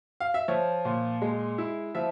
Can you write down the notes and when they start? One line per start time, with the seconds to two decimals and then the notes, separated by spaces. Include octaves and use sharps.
0.20 F5
0.34 E5
0.48 F3 C#5
0.85 A#2
1.22 G#3
1.58 E4
1.95 F3 E5